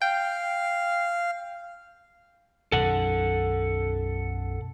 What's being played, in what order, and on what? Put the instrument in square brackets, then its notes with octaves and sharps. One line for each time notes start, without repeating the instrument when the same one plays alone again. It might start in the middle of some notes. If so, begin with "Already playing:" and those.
[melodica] F5 [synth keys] G5
[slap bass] B1 F#2 D#3 [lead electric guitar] A4 F#5